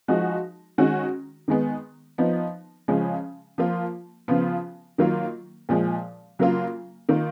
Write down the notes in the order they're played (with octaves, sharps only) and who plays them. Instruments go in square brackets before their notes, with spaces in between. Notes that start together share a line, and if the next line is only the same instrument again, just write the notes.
[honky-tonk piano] F3 G#3 D#4 F#4
D#3 G#3 C#4 F#4
D#3 G#3 B3
F3 B3 D#4
C#3 F3 G#3 C#4
F3 A#3 F4
C#3 F3 B3 F4
D#3 F#3 A#3 F4
A#2 F3 G#3
C#3 F#3 A#3 F4
D#3 A#3 F4